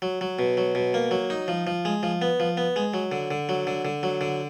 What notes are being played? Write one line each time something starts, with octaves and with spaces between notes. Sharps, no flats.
F#3
F#3
B2
F#3
B2
A#3
F#3
D#4
F3
F3
G#3
F3
B3
F3
B3
G#3
F#3
D3
D3
F#3
D3
D3
F#3
D3